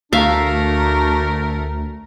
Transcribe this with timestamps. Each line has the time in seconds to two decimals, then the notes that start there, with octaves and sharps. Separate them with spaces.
0.13 D2 A3 D4 F#4 A#4 E5 F5